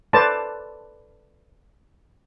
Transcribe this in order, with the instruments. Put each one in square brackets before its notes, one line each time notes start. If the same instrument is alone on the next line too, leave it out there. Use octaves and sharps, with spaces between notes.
[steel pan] A4 B4 C5 D5 A5